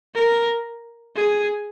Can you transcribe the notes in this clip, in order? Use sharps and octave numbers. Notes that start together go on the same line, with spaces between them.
A#4
G#4